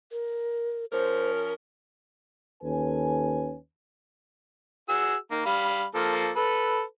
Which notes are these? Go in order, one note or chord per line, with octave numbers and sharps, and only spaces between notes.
A#4
F3 C#4 A#4 C5
D#2 C#4 A4 B4 G#5
F#4 G#4 E6
D#3 A#3
G3 F5 B5
F3 A#3 A4
A4 B4